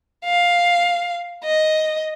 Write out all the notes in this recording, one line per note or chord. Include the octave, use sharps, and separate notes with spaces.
F5
D#5